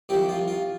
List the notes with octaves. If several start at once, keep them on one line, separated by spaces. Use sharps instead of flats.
C2 C3 F3 G4
F4
F4